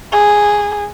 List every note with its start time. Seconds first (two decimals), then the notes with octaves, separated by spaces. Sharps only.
0.12 G#4